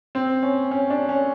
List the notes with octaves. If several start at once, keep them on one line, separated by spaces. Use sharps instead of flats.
C4
C#4
C#4
D4
C#4